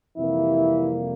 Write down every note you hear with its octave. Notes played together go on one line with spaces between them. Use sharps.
F2 C3 E3 G3 A#3 E4